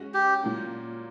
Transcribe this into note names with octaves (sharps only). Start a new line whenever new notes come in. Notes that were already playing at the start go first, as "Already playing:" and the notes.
Already playing: G#3 C#4 F#4
G4
A#2 F#3 A#3